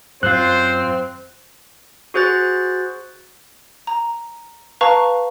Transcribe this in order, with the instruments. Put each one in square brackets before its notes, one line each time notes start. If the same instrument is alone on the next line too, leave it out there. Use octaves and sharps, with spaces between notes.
[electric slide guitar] F#2 F4 [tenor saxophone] C4 [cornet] C5 [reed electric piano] F#6
[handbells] F#4 G#4 C5 F#6 A6
[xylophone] A#5
B4 F5 A5 A#5 C#6